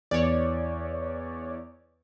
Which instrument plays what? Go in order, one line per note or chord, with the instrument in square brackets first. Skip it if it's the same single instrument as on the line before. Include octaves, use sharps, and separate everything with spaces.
[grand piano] E2 [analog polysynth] C#5 D5